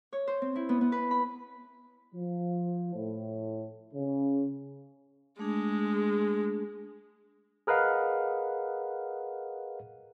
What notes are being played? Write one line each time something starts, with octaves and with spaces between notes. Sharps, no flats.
C#5
C5
C4
E4
B3
B3
B4
B5
F3
A2
C#3
G#3 A3 D4 G#4
G#4 A#4 B4 D#5 F5 F#5